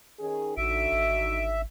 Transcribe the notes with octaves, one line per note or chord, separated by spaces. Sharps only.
D#3 C#4 G#4
A1 D3 D#4 F#4 E5 D7
G#1